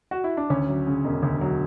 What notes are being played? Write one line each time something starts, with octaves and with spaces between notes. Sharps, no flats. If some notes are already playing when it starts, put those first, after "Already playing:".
F#4
E4
D4
D2 C#4
F#3
C#3
E1
D2
F#3